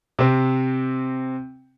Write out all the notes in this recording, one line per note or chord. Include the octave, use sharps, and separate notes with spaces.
C3 C4